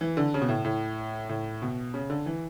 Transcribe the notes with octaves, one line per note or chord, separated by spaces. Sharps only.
E3
D3
C#3
B2
A2
A2
A2
B2
C#3
D3
E3